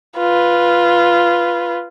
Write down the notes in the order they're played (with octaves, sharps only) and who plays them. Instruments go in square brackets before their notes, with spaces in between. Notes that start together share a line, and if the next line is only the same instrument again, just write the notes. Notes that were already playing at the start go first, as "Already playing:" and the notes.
[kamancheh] F4 B4